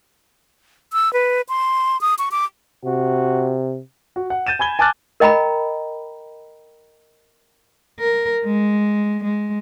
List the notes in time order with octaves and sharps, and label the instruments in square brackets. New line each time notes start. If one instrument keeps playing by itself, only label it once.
[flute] E6
B4
C6
D#6
C#6
D6
[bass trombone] C3 [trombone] F#4
[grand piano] F#4
F#5
G6 A6 D#7 E7
G#5 B5 G#6 G7
G#5 A5 D6 F6 F#6 A6
[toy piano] A#4 D#5 G5 A#5 B5
[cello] A#4
G#3
G#3